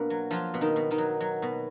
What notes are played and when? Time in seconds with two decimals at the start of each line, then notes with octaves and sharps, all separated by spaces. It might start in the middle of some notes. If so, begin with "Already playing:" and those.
Already playing: B2 A#3 D4 A#4
0.10 F#3
0.31 F3 F#3 F4
0.54 B2
0.61 D#3 D#4
0.76 B2
0.91 D#3 D#4
0.98 F#3
1.21 F#3
1.42 B2